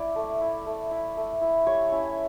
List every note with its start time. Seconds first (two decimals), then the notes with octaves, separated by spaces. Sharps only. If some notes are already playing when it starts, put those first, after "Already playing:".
Already playing: E4 D5
0.16 A3
0.40 E4
0.66 A3
0.91 E4
1.17 A3
1.41 E4
1.67 G3 C#5
1.92 C#4 E4